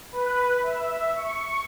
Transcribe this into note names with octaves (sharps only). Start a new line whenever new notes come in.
B4
E5
C#6